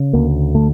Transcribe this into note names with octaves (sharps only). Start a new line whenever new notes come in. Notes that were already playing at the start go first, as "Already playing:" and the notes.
Already playing: C#3
D2 A#3
D3 A3